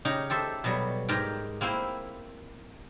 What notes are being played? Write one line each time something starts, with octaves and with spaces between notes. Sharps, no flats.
C#3 D#4 G4
G4 A4 C5 E5
B2 F#3 G3
G#2 G4 A#4 G5
A#3 C4 E4 C5